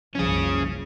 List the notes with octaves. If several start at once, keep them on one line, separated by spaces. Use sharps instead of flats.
F#1 C2 F3 C#4 G#4